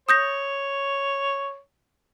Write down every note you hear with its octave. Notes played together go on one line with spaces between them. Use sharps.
C#5 D#6 G6 A#6